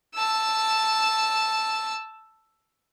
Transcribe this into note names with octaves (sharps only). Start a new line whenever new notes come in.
A5 E6